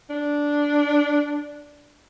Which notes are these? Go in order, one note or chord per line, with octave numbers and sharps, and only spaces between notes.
D4